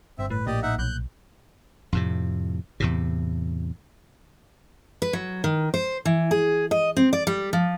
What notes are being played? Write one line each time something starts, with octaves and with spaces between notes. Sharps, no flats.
G1 C4 E5
A2 B4
A#1 A#3 G4 D5 D#5
D#4 E5 F#5
B1 F#6 G6
F2 A2 C3
E2 A2 C3
B4
F#3
D#3
C5
E3
G#4
D#5
C4
D5
G3
F3